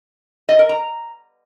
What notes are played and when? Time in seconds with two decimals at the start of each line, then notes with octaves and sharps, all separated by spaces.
0.49 D#5
0.59 A#4
0.69 A#5